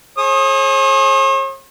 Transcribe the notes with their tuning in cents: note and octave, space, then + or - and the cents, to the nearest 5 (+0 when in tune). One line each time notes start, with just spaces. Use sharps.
G#4 +30 C#5 -45 D#6 +5